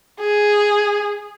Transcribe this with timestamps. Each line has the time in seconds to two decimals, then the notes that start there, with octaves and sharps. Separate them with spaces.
0.21 G#4